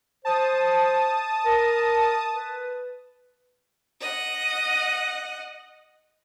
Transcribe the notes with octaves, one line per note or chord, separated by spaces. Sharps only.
C5 A5 D#6
A#4
B4
D#5 F#5